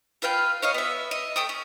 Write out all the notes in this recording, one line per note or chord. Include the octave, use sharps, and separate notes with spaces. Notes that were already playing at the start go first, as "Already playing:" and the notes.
F4 B4 F5 G5
C#5 D#5 F5
B3 E5
D#5
A3 G5 D#6
C#4